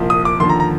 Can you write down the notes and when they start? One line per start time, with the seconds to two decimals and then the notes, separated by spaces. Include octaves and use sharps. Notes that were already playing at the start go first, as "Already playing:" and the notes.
Already playing: C2 A#2 F3
0.10 D#6
0.25 D6
0.40 D#2 D3 F3 C6
0.50 A#5
0.60 A#5